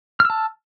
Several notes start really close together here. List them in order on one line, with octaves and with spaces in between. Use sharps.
F6 E6 A5